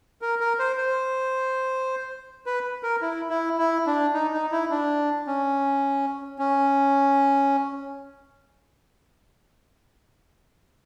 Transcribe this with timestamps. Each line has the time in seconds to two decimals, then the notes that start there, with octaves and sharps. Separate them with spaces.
0.22 A#4
0.40 A#4
0.59 C5
0.78 C5
2.46 B4
2.83 A#4
3.02 E4
3.30 E4
3.58 E4
3.87 D4
4.14 D#4
4.33 D#4
4.52 E4
4.70 D4
5.27 C#4
6.39 C#4